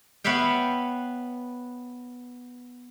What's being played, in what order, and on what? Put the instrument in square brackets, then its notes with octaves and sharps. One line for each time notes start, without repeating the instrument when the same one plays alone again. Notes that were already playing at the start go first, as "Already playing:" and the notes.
[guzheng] B3 B4 C#5 E5 F5 G5